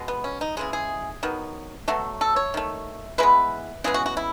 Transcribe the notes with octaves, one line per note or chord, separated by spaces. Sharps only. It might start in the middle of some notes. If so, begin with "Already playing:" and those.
Already playing: B2 G#3
B3
C#4
D#4
C#3 E3 G#3 G#4
G#4
D#3 F#3 B3
B2 F#3 A3
A4
C#5
D#3 A3
E3 G#3 B3 B4
C#3 E3 G#3 B3 G#4
F#4
F#4
E4